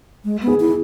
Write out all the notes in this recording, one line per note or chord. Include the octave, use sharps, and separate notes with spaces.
G#3
B3
G#4
E4